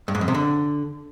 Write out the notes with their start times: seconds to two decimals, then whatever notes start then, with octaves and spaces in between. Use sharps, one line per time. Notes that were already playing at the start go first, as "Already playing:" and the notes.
0.08 G2
0.15 G#2
0.21 F2
0.28 C3
0.34 D3